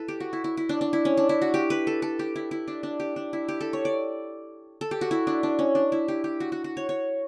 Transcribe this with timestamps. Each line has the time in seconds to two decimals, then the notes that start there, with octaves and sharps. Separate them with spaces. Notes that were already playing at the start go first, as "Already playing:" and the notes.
Already playing: E4 A4 B4
0.08 G4
0.20 F#4
0.33 E4
0.44 E4
0.57 E4
0.69 D4
0.81 D4
0.93 E4
1.05 C#4
1.17 D4
1.29 E4
1.42 F#4
1.54 G4
1.70 B4
1.87 A4
2.02 A4
2.19 G4
2.36 E4
2.51 E4
2.68 D4
2.83 D4
3.00 G4
3.16 D4
3.33 E4
3.48 G4
3.61 A4
3.73 C#5
3.85 D5
4.81 A4
4.91 G4
5.01 F#4
5.11 E4
5.27 D4
5.43 D4
5.59 C#4
5.75 D4
5.92 E4
6.08 G4
6.24 G4
6.40 F#4
6.52 F#4
6.64 F#4
6.77 C#5
6.89 C#5